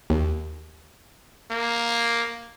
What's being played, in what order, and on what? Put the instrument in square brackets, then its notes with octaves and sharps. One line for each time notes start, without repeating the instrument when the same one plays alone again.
[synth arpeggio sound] D#2
[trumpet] A#3